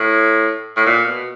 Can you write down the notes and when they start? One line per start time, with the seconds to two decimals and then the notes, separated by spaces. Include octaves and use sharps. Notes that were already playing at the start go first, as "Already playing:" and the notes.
Already playing: A2
0.76 A2
0.86 A#2
1.07 B2